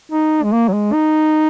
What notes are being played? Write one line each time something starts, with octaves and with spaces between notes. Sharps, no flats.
D#4
G#3
A#3
F#3
G#3
D#4